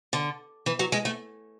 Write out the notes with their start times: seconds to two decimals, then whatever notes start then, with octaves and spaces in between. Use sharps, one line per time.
0.13 D3
0.66 E3
0.79 F#3
0.92 G#3
1.05 A3